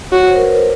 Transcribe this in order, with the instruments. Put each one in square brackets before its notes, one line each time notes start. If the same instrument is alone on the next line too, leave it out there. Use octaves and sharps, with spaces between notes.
[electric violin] F#4 [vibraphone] C#5
[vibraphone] C5
A#4
B4
A#4